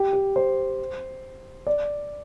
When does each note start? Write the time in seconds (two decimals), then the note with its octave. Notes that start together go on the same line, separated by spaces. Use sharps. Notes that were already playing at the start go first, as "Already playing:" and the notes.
Already playing: G4
0.13 G4
0.36 C5
1.67 D5